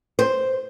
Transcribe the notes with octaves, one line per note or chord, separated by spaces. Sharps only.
C5